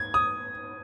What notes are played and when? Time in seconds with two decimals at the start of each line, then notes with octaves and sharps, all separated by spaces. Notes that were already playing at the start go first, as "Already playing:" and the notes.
Already playing: G#6
0.14 D#6